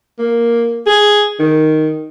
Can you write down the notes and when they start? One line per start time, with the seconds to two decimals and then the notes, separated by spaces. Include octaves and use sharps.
0.18 A#3
0.86 G#4
1.39 D#3